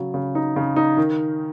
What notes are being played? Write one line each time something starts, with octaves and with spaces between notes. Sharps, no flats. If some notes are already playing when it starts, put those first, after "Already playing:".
Already playing: C#3 F#3
C#3
D#4
C#3
D#4
D#3